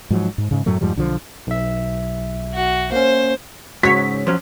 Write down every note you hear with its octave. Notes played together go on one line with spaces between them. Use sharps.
G#2 F3 F#3
G#2
G#2 C#3
F#2 A2 F#3 A3
F2 G#2 F3 G3
B1 D3 E3 F3
B1 E5
F#4
A#3 C#4 C5
G#2 C#3 F#4 C#5 B6
F3 F#3 C#4